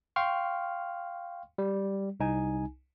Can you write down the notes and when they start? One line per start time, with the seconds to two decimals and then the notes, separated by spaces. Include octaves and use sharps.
0.16 F5 G5 C6 C#6 F6
1.58 G3
2.20 C2 D#4 G#5